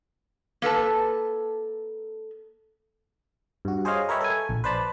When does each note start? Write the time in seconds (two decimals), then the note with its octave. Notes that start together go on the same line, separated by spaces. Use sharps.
0.62 A#3 A4 B4 A5
3.65 G2 F#4
3.85 G#4 C5 C#5 D#5 F5 G#5
4.09 A#4 B4 C#5 E5 G5 B5
4.21 A4 G#5
4.49 A#1
4.64 B4 C5 D5 A5 B5